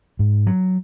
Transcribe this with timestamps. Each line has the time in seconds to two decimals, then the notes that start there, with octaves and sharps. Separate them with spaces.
0.19 G#2
0.47 F#3